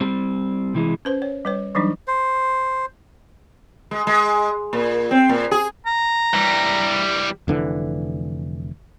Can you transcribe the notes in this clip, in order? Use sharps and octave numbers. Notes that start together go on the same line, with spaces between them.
G3 C4
C3 E3 G#3
C#4 B4 C5
C#5
G3 B4 C#5
E3 F#3 G3 D4 D#4
C5
G#3
G#3
A#2
C4
A#2
G#4
A#5
E3 G3
F1 D3 E3